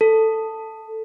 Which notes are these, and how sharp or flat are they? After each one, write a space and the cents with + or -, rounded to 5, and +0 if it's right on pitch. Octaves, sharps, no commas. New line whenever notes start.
A4 +10